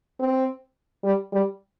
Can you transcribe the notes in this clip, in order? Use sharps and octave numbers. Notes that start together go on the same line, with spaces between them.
C4
G3
G3